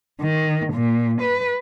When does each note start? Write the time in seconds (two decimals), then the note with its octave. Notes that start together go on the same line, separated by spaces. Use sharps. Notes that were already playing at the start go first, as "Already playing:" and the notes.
0.21 D#3
0.73 A#2
1.21 B4